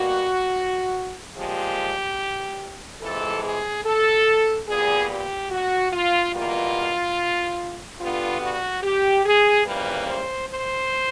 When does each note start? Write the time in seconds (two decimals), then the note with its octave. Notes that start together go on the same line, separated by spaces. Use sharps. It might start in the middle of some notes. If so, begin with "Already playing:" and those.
Already playing: B2 G3 A#3 F#4
1.35 A#2 F3 G#3 G4
3.01 F2 C3 E3 G#3 A4
3.43 G#4
3.85 A4
4.68 A#2 G3 B3 G#4
5.10 G4
5.51 F#4
5.93 F4
6.34 E2 B2 G3 A#3 F4
8.00 G2 D3 G3 B3 F4
8.41 F#4
8.83 G4
9.25 G#4
9.66 F2 C#3 E3 G3 A#3 B4
10.07 C5
10.49 C5